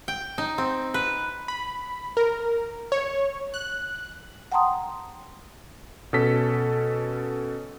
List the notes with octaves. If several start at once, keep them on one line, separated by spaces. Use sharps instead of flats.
G5
D#4
C4
B4
B5
A#4
C#5
F#6
F#5 G5 A5 A#5 C6 D#6
B2 C#4 A4 B6